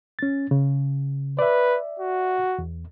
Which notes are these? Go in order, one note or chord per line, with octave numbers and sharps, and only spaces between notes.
C#4 A6
C#3
B4 D5 E5
F#4
E2